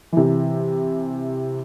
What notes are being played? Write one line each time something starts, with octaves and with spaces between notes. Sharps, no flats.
C3 E3